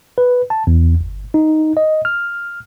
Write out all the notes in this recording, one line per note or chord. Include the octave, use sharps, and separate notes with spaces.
B4
A5
E2
G1
D#4
D#5
F6